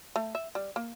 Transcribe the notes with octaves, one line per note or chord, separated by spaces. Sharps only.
A3
E5
G3
A#3